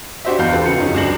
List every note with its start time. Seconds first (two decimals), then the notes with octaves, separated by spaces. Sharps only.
0.25 D4 F#4 G4 C5 D#5 E5
0.39 E2 D#5 F5 F#5 B5 G6
0.52 C4 F4 G4 A4 B4
0.66 C#3 F#3 F4 C#7
0.78 F#2 D3 C#4 D#4
0.94 C#2 F#3 D4 G#4 A#6 F#7